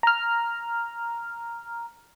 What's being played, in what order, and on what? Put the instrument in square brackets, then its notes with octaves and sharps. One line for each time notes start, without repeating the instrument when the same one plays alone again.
[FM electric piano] A#5 F6